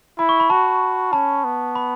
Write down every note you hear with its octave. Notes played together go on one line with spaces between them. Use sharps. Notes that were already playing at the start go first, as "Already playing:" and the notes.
E4 B5
C#6
B5
F#4 A5
C#4 A5
B3
B5